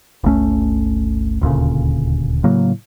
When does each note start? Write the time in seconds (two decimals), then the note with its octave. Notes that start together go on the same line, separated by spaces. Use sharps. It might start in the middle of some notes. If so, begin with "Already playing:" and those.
0.24 G1 C#2 A3 C#4
1.41 D#1 D2 A#2 C#3
2.44 A2 C#3 F#3 A#3